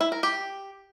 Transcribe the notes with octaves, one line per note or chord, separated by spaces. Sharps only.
E4
A#4
G4